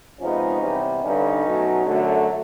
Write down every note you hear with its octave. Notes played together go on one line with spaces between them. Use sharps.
C3 F3 G#3 B3 C#4 D#4
C3 E3 G3 B3
G2 D3 G3 B3 C#4 D#4
B2 F#3 A3
F#2 D3 F#3 A3